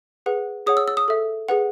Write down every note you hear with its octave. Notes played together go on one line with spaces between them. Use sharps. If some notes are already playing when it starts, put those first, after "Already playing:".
G#4 B4 F#5
G#4 C#5 F#5 D#6
E6
E6
D#6
A4 E5
G#4 B4 F#5